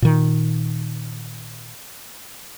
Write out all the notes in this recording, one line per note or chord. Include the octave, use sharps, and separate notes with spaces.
A#2 D#3